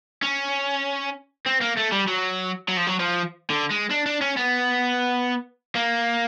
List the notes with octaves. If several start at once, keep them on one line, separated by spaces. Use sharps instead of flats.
C#4
C4
A#3
A3
G3
F#3
F#3
F3
F#3
F3
D3
G#3
D4
D4
C#4
B3
A#3